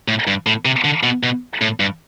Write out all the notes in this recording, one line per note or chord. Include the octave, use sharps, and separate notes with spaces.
A2
G2
A2
C3
D3
B2
B2
A2
G2